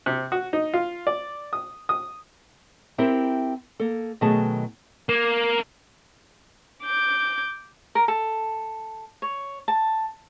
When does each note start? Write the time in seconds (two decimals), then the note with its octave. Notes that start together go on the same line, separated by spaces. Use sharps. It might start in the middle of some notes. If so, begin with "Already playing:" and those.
0.06 C3
0.32 F#4
0.53 D#4
0.74 F4
1.07 D5
1.53 D#6
1.89 D#6
2.98 C4 E4 G4 A#4 C5 E5
3.80 A#3 A4
4.21 B2 D#3 F#3 A3 G#4 A5
5.09 A#3
6.84 D6 G6
7.95 A#4
8.08 A4
9.22 C#5
9.68 A5